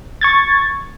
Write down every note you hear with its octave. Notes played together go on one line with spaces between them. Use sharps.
C#6 G#6 A6